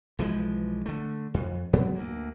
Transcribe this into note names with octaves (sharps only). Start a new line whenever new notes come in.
B1 E3 F3 G#3
D3 A3
F2
G#2 F#3 B3 C4
D2 A#3